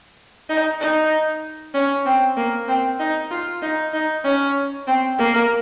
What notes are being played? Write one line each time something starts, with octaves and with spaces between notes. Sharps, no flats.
D#4
D#4
C#4
C4
A#3
C4
D#4
F4
D#4
D#4
C#4
C4
A#3